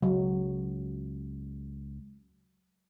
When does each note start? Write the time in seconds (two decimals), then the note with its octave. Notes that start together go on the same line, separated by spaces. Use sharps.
0.02 C#2 F#3